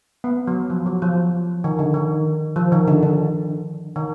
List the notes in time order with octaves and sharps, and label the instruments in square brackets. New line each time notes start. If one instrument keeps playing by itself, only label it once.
[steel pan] B3
F#3
F3
F#3
F3
D#3
D3
D#3
F3
D#3
D3
D3
D#3